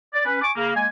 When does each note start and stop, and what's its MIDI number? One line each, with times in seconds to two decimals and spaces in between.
0.13 0.23 74
0.25 0.39 61
0.25 0.39 71
0.42 0.50 80
0.42 0.50 85
0.42 0.50 86
0.56 0.71 49
0.56 0.71 58
0.75 0.86 56
0.75 0.86 58
0.75 0.86 80